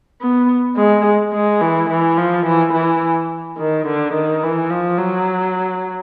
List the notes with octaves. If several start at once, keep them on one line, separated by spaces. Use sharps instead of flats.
B3
G#3
G#3
E3
E3
F3
E3
E3
D#3
D3
D#3
E3
F3
F#3